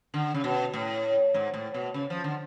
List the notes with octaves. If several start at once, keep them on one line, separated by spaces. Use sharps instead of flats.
D3
C#3
B2
A2
G#2
A2
B2
C#3
F3
D3